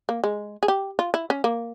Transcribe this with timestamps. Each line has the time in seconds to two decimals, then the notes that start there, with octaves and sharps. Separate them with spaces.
0.09 A#3
0.24 G#3
0.63 G#4
0.68 G4
0.99 F4
1.14 E4
1.30 C#4
1.44 A#3